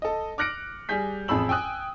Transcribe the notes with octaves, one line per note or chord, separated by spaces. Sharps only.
A4 D#5
D6 F6 F#6 A#6 C#7 D7
G3 G#4 G#5 G6 B6
A1 F2 G#4 B5 E6 F#7
G5 G#5 D#6 F#6